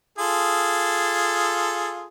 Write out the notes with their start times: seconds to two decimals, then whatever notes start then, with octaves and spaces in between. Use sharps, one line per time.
0.18 F4 G#4 A4